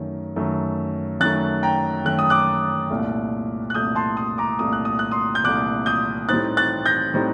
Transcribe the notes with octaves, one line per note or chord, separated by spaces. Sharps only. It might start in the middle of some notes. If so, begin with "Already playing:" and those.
Already playing: F#2 D#3 A3
F#2 D#3 A3
F#2 D#3 A3 F#6 A6
G5 A#5
F#2 D#3 A3 F#6
D#6
D6 F#6
C2 A#2 A3
F#6
C2 A#2 A3 D#6 G6
A5 C6
C6 D#6
A#5 D6
C2 A#2 A3 D#6
F#6
D#6
F#6
C6 D#6
G6
C2 A#2 A3 D6 F#6
D#6 G6
A2 G3 C4 D#4 F#6 A6
F#6 A6
G6 A#6
A2 G3 C4 D#4